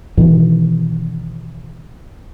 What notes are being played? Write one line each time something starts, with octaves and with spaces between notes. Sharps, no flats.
B2 D#3 E3